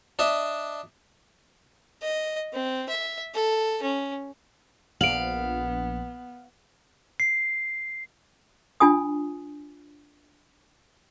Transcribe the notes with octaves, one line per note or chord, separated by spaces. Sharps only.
D4 D#5 E5
D#5
C4
E5
A4
C#4
A#1 B3 F5 D7 F#7
C7
D4 F4 G#5 D#6